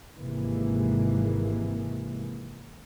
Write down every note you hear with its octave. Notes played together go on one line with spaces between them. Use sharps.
G#1 G#2 C3 E3 G#3 A#3